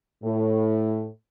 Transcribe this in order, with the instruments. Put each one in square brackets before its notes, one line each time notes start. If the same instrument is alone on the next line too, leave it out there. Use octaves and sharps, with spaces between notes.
[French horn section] A2